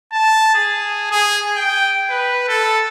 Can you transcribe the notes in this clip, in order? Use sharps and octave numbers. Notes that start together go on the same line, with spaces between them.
A5
G#4
G#4
G5
B4
A4